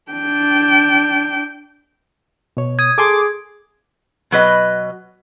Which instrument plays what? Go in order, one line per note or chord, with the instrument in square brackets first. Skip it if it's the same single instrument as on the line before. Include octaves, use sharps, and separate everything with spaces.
[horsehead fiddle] D4 G5
[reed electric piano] B2 C#5
[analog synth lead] D#6 [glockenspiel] G#6
[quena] G#4 [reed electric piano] A4 G#5 C6 [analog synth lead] D6
[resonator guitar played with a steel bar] B2 F#3 B4 D#5